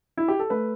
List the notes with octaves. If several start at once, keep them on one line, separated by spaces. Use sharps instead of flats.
E4
G4
A4
A3 B4